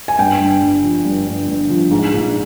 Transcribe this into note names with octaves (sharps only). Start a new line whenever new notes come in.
G#5
G2 G5
G1
G1
F3
G2
G1
G1
F3
G#2
A#1